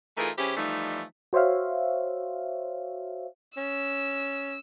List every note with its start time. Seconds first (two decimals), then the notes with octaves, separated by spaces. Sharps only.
0.18 E3 A3 D#4 F4 G#4 A#4
0.38 E3 C#4 E4 G4 G#4 C5
0.57 E3 F3 G3 A3 D#4
1.33 F#4 C5 C#5 E5 F5
3.57 C#4 E6